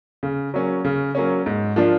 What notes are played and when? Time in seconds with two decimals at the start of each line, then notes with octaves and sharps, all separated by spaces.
0.23 C#3
0.54 F#3 A#3 C#4
0.85 C#3
1.15 F#3 A#3 C#4
1.46 G#2
1.76 F3 A#3 D4 F4